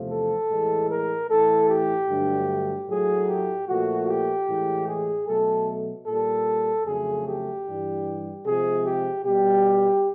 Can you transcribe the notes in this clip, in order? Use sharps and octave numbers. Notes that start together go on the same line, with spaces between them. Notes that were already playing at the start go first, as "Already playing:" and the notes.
Already playing: E2 C3 F3 A3
A4
A2 E3 G#3
A#4
A2 E3 A3 A4
G4
G2 D3 F#3 A3
A2 F#3 A3 G#4
G4
A#2 F3 A3 F#4
G4
A2 E3 G#3
G#4
B2 F#3 A3 A4
A#2 G3 A4
F2 C#3 F#3 A3 G#4
G4
G2 E3 G3
C3 F3 G#3 G#4
G4
B2 G3 G4